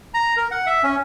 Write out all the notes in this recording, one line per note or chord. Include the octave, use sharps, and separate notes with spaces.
A#5
A#4
F#5
E5
C#4